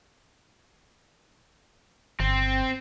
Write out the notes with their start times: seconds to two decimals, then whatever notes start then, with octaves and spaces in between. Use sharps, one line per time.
2.20 G1 C4